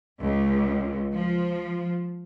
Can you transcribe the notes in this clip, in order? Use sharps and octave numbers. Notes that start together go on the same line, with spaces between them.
C#2
F3